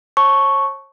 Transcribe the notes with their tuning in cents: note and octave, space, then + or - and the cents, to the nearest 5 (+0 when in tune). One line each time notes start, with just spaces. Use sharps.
C#5 -45 A5 +0 C#6 +0